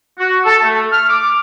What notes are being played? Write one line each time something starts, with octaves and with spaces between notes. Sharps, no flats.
F#4
A4
A3
F6
D6